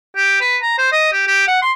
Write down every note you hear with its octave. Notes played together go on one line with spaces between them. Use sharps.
G4
B4
A#5
C5
D#5
G4
G4
F#5
C6